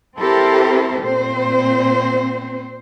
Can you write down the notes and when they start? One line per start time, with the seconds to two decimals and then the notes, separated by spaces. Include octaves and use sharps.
0.19 C4 E4 G4 A4 A#4 C5
1.02 A#2 C4 C5